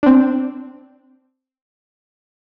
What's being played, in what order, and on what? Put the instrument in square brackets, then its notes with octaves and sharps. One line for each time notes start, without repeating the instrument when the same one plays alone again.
[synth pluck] C4 D4